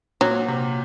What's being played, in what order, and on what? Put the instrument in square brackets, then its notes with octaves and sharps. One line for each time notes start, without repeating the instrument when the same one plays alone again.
[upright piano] A#2 [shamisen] F#3
[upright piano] C3